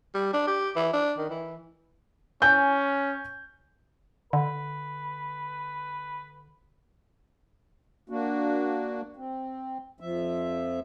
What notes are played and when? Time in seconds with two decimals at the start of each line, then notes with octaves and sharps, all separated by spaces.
0.14 G3
0.33 D4
0.47 G4
0.76 E3
0.93 D4
1.18 D#3
1.30 E3
2.42 C#4 G#5 G6
4.33 D3 B4
8.09 A#3 D4 F#4
9.16 C4
10.00 F2 F3 E5